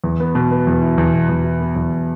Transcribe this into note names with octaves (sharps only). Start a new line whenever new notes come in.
E2
B3
B2
B3
E2
E4
E2
B2
E2
E4
B3
E2